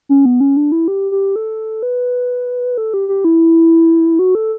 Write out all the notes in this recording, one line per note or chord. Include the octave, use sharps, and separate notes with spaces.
C#4
B3
C#4
D4
E4
G4
G4
A4
B4
A4
G4
G4
E4
F#4
A4